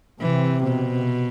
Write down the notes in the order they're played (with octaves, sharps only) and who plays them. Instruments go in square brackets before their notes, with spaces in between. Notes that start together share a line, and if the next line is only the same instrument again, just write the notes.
[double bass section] C3 [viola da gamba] E3
[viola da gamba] B2